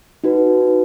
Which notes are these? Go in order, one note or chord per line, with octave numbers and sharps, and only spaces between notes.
D#4 F#4 B4